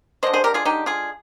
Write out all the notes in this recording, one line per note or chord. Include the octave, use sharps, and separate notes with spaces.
D3 G#3 C5 D#5
G#4 C5
G4 A#4
F4 G#4
D3 G#3 D#4 G4
F4 G#4